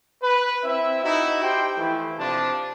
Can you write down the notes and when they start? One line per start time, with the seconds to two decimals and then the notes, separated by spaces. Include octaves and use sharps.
0.22 B4
0.64 C4 E4 E5
1.03 D#4 E4 F#4
1.43 G4 C5 G5
1.77 E3 F3 A3 E4
2.18 C3 F3 D4 A5